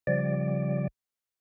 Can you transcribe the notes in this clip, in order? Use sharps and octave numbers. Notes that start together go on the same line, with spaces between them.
C#3 F3 G3 D5